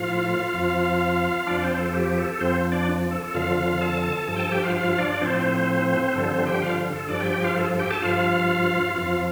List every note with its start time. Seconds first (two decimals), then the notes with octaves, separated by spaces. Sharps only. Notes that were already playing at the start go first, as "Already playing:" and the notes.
Already playing: A2 F3 F4 F5
0.54 F2 F3
1.47 F2 F3 D4 D5
1.63 C4 C5
1.78 A4
1.94 G4
2.17 A4
2.40 F2 F3 C4 C5
2.72 D4 D5
3.11 A4
3.34 F2 D3 F3 F4 F5
3.57 F4 F5
3.81 A4 A5
4.28 G2 F3 A4 A5
4.36 G5
4.39 A4 A5
4.52 G4 G5
4.63 F4 F5
4.75 F4 F5
4.98 D4 D5
5.21 A2 F3 C4 C5
6.15 G2 D3 F3 A4
6.31 C4 C5
6.46 G4 G5
6.62 F4 F5
6.93 A4
7.08 G2 F3 D4 D5
7.20 G4 G5
7.32 G4 G5
7.44 F4 F5
7.56 A4
7.79 G4 G5
7.91 A4 A5
8.02 G2 F3 F4 F5
8.96 F2 F3 F4 F5